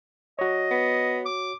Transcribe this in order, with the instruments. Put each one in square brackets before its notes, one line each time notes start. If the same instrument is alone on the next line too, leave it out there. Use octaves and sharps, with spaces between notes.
[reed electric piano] F#4 C#5 [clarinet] D#5
[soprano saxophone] B3
[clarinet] D6